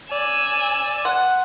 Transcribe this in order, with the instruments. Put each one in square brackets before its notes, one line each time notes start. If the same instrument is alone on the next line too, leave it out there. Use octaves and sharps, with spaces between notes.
[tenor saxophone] D5 [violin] G#5 E6
[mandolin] F#5 [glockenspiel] C6 F#6